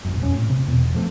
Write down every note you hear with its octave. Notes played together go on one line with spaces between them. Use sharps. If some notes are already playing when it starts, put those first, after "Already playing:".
D#1 A#1 F#2
E1 G#2 C#4
A2
C3
E2 B2
F3 A3 C4